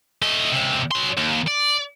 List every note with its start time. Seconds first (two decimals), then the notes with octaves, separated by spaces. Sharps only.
0.22 A3 D#5
0.52 C#2 C3
0.91 F#3 C6
1.17 D#2
1.47 D5